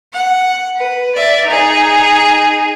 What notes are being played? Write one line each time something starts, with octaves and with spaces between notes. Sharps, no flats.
F#5
B4
D5 E5
D#4 G#4